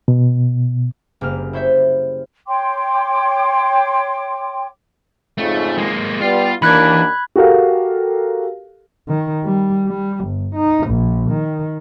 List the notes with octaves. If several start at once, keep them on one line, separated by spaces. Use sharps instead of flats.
B2
F#1 G3 A#3 F6
E4 C5 C#5 E5 G6
C#5 G5 C6 D6
F2 G#2 C#3 A3
G#3 A#3
G3 B3 F4 F5
D#2 E3 A#3 D4 B5 F#6 G#6
F#4 G4 A4 A#4 F5
D#3
G3
G3
G1
D#4
A#1
D#3